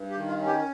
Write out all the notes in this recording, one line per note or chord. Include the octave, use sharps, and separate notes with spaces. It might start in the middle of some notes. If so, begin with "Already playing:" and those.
Already playing: G2
G4
D#3
F4
C#4
G4